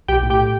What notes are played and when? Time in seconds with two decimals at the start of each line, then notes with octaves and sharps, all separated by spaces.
0.08 B1 G4 G5
0.23 A2
0.30 G4 G5
0.38 A2